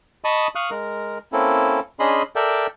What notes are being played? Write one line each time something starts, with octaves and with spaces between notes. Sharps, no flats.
D#5 A5 B5 C#6 D#6
F5 C#6 D#6 F6 F#6
G#3 A#4
A#3 C4 C#4 E4 A4
C#4 D4 G#4 D#5 B5 C6
A4 A#4 D5 E5 G5